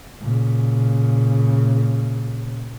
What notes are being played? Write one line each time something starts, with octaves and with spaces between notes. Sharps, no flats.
A#2 C#3